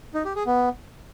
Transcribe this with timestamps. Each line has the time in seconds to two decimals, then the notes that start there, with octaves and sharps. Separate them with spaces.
0.14 D#4
0.25 G4
0.36 G#4
0.46 B3